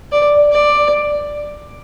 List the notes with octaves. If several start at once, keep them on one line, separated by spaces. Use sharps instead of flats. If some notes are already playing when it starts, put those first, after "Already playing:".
D5
D5